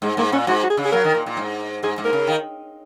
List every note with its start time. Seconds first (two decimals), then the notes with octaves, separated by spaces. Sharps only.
0.02 G#2 G#3
0.17 G#2 A#3
0.32 A#2 C#4
0.47 G#2 F#4
0.63 F#4
0.70 G#4
0.77 C#3
0.85 G#4
0.92 F#3 A#4
1.04 D#3
1.14 A#2
1.26 A#2
1.37 G#2
1.83 G#2 G#4
1.98 G#2
2.04 A#4
2.13 C#3
2.27 D#3